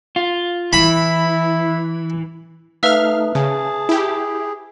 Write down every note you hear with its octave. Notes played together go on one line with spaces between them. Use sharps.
F4
E3 E4 B5
A3 D#4 B4 E5 F5 E6 F6
C#3 G#4 A5
E4 G4